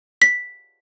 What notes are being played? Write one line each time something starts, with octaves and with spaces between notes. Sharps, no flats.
B6